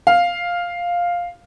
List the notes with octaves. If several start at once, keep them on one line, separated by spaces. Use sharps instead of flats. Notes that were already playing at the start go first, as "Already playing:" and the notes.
F5